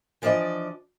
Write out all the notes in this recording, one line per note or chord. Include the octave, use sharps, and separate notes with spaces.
E3 F3 D4 D5 D#5